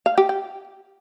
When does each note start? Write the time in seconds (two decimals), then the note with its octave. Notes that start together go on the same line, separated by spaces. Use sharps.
0.06 F5
0.18 G4
0.29 G5